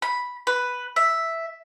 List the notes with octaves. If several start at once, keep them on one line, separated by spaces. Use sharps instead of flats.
B5
B4
E5